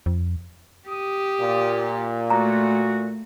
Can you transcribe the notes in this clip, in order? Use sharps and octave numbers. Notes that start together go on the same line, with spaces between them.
F2
G4 D#6
A#2
A3 F#4 A#5